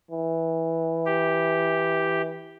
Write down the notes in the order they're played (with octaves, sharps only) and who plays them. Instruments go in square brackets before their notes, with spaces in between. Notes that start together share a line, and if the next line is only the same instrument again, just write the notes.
[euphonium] E3
[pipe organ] G4